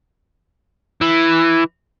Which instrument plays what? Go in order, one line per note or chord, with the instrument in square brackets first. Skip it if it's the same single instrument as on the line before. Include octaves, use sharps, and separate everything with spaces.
[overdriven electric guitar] E3